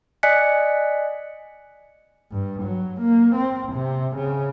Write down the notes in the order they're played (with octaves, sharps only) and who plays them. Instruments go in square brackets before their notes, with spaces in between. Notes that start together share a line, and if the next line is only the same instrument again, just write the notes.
[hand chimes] D5 D#5 G#5 F#6 B6 C#7
[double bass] G2
F#3
A#3
C4
C3
C#3